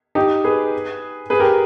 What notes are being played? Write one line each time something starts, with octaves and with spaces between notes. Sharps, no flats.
D#4 G4
G#4 B4
G#4 B4
G4 A#4